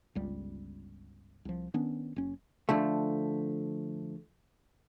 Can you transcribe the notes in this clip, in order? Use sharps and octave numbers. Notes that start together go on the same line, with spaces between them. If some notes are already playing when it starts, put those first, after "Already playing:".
G1 C#2 G3
C2 F3
D#3 B3 C#4 D4
F#1 C#4
D3 F3 A3